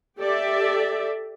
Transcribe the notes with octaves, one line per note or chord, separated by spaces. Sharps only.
G4 A4 D5 E5